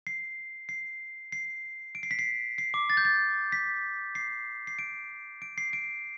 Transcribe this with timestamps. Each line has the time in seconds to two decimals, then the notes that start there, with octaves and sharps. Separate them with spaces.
0.07 C7
0.69 C7
1.32 C7
1.95 D7
2.03 C7
2.11 B6
2.19 C7
2.58 C7
2.74 D6
2.90 A6
2.97 G6
3.05 A6
3.52 B6
4.15 C7
4.67 C7
4.79 D7
5.42 D7
5.58 C7
5.73 D7